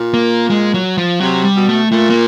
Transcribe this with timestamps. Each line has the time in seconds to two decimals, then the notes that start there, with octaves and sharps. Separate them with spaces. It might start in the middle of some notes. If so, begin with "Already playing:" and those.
Already playing: A#2
0.14 A#3
0.50 G#3
0.74 F#3
0.98 F3
1.20 C3 F#3
1.45 G3
1.56 B2
1.69 A3
1.92 A#2 A3
2.10 A#3